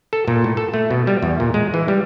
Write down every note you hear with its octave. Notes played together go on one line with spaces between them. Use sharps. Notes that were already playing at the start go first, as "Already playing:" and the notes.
A4
A#2
A2
A4
A3
B2
G3
E2
A#2
G#3
E3
G3